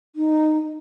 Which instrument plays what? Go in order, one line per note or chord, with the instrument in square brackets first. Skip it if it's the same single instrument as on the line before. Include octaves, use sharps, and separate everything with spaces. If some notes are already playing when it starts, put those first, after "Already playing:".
[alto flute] D#4